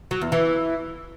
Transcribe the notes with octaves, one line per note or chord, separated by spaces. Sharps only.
F#3
E2
E3